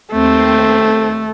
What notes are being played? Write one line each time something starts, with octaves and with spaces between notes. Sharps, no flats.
D#2 A3 C4